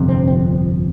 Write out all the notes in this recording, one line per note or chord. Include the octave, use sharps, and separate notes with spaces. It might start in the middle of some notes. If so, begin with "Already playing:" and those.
Already playing: G1 F2 C3
C4
C4